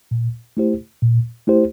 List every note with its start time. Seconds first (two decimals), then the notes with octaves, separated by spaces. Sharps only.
0.11 A#2
0.57 A3 E4 G4 C5
1.02 A#2
1.47 A3 E4 G4 C5